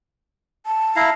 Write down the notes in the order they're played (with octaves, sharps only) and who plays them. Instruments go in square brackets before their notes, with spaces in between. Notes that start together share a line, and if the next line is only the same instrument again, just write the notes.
[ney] A5
[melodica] E4 F5 A#5